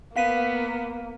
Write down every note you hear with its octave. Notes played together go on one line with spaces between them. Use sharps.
A#3 B3 F5 B6 D#7